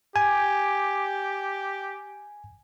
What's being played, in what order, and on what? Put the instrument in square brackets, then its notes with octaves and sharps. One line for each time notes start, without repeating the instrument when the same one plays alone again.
[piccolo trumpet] G4 [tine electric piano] G#5